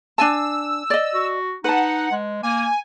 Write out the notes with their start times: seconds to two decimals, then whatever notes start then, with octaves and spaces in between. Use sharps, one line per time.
0.18 D4 G#5 A5 E6
0.90 D5 D#5
1.14 F#4
1.64 D#4 B4 F#5 A5
2.12 G#3
2.43 A#3 G#5